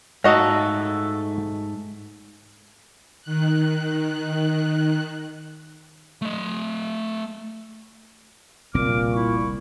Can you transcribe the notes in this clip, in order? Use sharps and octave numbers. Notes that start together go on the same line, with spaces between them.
G#2 A3 D#4 F#4 A4 D#5 F5 A#5
D#3 F#6
A3 D#5
F1 C2 A#2 C4 D6 F6
E4 C#6